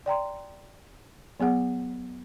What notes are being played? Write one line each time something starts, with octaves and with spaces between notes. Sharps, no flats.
D5 G5 A#5 C6
F#3 B3 G#4 F#5